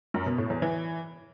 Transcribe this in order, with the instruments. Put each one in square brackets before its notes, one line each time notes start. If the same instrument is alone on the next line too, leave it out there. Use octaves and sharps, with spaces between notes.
[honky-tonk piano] F#2
B2
A2
E2
E3